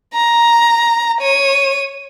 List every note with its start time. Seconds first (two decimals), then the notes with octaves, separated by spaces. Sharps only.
0.14 A#5
1.21 C#5 D#7